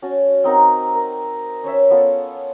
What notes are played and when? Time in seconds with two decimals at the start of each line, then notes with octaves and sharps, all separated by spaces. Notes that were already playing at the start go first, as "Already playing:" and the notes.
0.02 C#4 F#4 A5
0.44 C4 D#4 A#4 F#5
0.95 A#4
1.64 C#4 C5 C#5 E5
1.90 B3 F4 A4